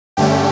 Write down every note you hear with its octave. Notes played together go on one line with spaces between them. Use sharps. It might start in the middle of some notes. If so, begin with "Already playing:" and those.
G2 D3 A3 C#4 G4